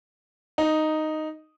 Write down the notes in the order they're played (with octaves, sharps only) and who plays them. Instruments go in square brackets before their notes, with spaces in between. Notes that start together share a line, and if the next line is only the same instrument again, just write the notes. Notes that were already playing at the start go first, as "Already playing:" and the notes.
[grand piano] D#4